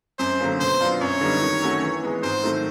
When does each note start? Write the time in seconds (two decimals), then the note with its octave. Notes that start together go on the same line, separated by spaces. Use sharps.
0.19 F#2 C5
0.40 D3 F#3 A#3 C#4
0.60 B2 C5
0.81 F#3 B3 D4 F4
1.01 F#2 C#5
1.21 D3 G3 B3 D#4
1.42 D#3
1.62 F#3 A3 C#4 F#4
1.82 E3
2.02 G#3 B3
2.23 G#2 C5
2.43 D#3 F#3 A3